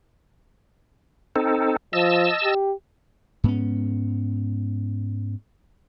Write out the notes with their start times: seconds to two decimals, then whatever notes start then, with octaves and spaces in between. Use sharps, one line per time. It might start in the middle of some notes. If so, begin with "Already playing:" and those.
1.36 C4 D#4 A4
1.93 F3 D#5 A5 E6
2.44 G4
3.44 G#2 B3 C#4